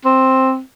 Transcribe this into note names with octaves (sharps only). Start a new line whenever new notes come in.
C4